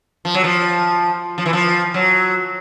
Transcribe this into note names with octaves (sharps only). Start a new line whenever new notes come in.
F3
F#3
F3
F3
E3
F3
F#3